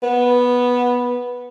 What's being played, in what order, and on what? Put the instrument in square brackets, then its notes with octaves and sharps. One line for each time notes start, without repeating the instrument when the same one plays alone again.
[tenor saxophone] B3